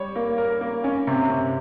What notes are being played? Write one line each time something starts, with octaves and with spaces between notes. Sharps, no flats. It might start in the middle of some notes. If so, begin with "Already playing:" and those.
Already playing: G3 C#5
A#3
A#4
A#3
C#4
C3
C3